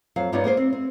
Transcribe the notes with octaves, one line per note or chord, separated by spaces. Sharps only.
F2 F#3 F5
G2 A#3 B3 D#4 C#5 D5
A#3 G#4 A4 C5
C4
C4